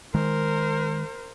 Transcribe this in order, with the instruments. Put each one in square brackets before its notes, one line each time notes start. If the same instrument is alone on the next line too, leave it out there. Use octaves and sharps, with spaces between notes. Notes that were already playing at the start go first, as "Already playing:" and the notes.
[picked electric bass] D#3 G#3 [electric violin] A#4 C5